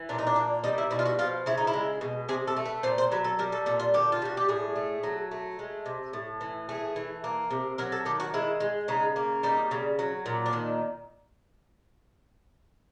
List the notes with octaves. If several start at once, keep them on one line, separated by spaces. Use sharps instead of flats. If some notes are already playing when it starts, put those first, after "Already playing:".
Already playing: E3
A#2 D4
D#4
D4
A#3
G3 D#4
E4
B2 E4
F4
F#4
F3 F4
C#3 E4
D#4
E4
G#3
B2
C3 G#4
A4
A3
B4
A#2 C5
C5
F#3 B4
A4
G3 A#4
A4
A#2 A4
F4
D3 G4
F4
G3 F#4
G4
A2 G#4
A3
F#3
A3
G#3
C3
A2
E3
A3 G#4
E3
A#3
C3
F#3 A#4
A4
D#3 G4
F#4
G#3 E4
G#3
C#3 D#4
A#3
G3 D#4
C#3
F#3
A#2
D4
D#3